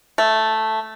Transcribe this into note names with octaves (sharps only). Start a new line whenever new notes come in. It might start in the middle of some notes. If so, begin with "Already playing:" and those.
A3